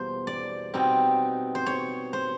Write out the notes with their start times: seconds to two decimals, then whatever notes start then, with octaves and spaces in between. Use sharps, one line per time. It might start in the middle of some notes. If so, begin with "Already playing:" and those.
Already playing: E2 B2 G3 A#3 C5
0.27 D5
0.74 B2 G3 C4 D#4
1.55 C5
1.66 C#5
2.13 C5